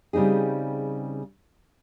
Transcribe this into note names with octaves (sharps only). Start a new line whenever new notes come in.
C#3 G3 C4 D#4 G#4